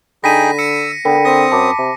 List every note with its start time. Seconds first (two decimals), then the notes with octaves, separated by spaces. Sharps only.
0.24 D3 D#4 G#4 G5 B5 A#6 B6 D#7
0.59 E6 C#7
1.05 D3 B3 A#4 G5 B5
1.25 C4 D#6 A#6
1.52 F#2 A5 B5 D6
1.79 C3